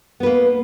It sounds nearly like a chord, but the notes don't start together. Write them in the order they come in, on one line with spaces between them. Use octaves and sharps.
B3 B4 A#3